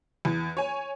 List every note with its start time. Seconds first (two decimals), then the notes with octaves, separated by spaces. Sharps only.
0.25 E2
0.57 C#5 G#5